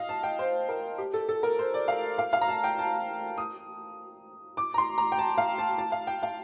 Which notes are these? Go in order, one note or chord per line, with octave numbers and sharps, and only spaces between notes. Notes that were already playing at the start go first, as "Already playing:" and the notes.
Already playing: D#5 F5
A5
G5
C5
A#4
G4
A4
A4
A#4
C5
D5
F5
F5
F5
A#5
A5
G5
A5
D#6
D6
A#5
C6
A#5
G5
A5
F5
A5
A5
F5
G5
F5